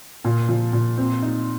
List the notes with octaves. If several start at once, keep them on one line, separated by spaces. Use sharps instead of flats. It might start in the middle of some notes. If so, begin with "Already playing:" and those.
A#2
F3
A#2
C4
D#4